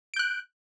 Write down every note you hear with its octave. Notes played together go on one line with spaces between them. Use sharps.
F#6 G6 D7